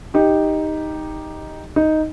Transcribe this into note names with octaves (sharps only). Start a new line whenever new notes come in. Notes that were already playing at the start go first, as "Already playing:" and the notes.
D#4 G4
D#4